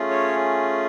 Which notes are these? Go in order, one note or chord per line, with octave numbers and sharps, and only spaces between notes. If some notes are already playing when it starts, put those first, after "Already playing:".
Already playing: A3 C#4 F4 G#4
C#5